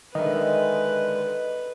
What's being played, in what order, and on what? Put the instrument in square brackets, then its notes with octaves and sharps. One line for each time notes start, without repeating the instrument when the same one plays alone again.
[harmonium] D3 G#3 [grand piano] D#3 E5 [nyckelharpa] B4 [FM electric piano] D#5